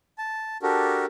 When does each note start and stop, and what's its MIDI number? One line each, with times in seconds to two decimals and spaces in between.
0.18 0.57 81
0.63 1.06 62
0.63 1.06 66
0.63 1.06 67
0.63 1.06 69
0.63 1.06 70